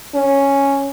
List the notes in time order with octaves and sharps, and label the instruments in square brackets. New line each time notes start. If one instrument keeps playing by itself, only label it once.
[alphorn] C#4